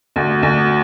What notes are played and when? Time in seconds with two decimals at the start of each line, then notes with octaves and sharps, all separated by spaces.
0.16 D2
0.43 D2